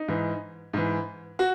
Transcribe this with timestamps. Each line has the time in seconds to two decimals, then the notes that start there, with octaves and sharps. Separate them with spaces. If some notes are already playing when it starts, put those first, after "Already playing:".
Already playing: D#4
0.08 G#2 E3
0.73 G#2 E3
1.39 F#4